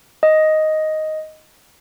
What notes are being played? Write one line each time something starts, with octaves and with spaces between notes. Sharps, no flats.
D#5